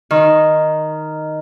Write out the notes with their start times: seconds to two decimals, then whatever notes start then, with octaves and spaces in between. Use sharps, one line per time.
0.11 D#3